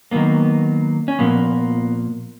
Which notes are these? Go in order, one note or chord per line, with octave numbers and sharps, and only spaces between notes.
D#3 F#3 A#3 B3
C#4
A#2 F3 A#3 B3